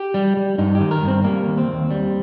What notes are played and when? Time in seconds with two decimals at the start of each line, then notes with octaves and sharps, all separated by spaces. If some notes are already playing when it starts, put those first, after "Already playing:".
Already playing: G4
0.14 G3
0.37 G3
0.58 G2 D#4
0.75 D#3 G4
0.91 A#4
1.02 G2
1.07 C4
1.24 G3 A#3
1.46 D#2
1.58 C4
1.68 D#2
1.91 G3